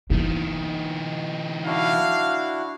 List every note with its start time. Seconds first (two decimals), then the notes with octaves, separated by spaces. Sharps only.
0.10 E3 A#3 B3 D#4
1.66 D4 E4 F#4 F5